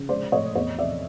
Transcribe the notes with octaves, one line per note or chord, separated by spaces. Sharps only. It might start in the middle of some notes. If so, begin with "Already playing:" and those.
Already playing: C#3
G#3 C5 D5
A2 C#5 D#5
E2 C#5 D#5
C3 D5 E5